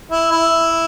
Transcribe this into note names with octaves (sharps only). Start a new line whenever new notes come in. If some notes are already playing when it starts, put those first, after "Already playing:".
E4
E4